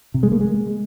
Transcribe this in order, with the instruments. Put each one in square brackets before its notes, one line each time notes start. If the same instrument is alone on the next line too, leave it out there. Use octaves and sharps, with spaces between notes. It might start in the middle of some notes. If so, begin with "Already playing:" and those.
[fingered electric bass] C3
G#3
A#3
G#3